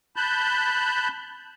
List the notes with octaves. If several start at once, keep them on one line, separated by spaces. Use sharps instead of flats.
A5 B5 F#6 G6